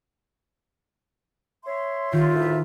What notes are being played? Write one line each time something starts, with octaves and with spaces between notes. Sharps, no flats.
C#5 E5 C6
D#3 F4 G4
D2 A2 E5